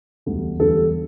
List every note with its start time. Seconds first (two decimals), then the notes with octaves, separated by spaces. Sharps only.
0.26 E1 D2 D3 G3
0.60 E1 D2 D3 G3 A4